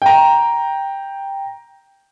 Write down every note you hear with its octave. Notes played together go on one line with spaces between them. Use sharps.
G5 A#5